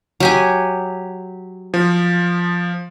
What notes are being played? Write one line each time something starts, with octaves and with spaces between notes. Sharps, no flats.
F#3 G4 G#5
F3